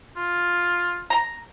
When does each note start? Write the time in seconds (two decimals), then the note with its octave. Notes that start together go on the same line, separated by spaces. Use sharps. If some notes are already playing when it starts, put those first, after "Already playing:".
0.17 F4
1.10 A#5